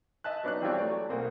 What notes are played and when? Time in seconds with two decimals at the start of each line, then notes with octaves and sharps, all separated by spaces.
0.24 D#5 E5 A5 F#6
0.44 F#3 B3 D4 D#4 F#6
0.62 E3 G3 C4 F4 C#5 D5
0.78 F#3 A3 D5
1.09 B1 A#3 C4